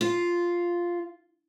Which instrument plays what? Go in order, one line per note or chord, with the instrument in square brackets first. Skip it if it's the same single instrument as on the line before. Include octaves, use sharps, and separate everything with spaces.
[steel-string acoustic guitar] F4